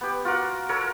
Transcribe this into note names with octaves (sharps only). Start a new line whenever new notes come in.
B3 G4
F4 F#4 A#4 F#5
A4 A#4 C#5